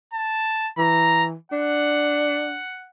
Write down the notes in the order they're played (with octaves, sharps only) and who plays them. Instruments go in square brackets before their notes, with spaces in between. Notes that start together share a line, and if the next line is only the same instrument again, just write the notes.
[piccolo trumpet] A5
[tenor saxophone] E3 [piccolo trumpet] A#5
[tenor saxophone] D4 [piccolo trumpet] F#5